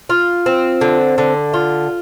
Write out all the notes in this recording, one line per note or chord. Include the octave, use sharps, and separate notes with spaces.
F4
C4
D3
D3
F4